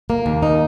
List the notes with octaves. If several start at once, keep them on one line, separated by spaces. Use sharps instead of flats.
A#3
D#2
D#4